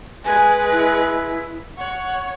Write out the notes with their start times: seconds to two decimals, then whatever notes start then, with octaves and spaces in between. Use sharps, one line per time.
0.25 G#3 B4 G#5
0.72 E4
1.78 C#5 F#5